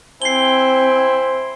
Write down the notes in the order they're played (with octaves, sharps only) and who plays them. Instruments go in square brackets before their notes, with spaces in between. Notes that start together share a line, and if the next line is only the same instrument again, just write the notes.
[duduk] C4 [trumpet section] E4 G5 G#5 [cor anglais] C5 [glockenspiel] C7 G7